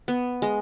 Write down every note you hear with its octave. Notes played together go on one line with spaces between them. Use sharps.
B3
G#3